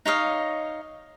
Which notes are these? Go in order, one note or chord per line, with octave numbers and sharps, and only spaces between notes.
D#4 C#5 D#5 F5